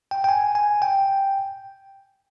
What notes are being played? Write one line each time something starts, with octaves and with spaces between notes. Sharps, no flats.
G5
G5
G#5
G#5
G5